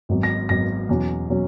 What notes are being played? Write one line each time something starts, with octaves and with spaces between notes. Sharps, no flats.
G#1 G#2 F#3 B3
A#6
G#1 G#2 F#3 B3 A#6
E2 B2 F#3 C#4
B2 F#3 C#4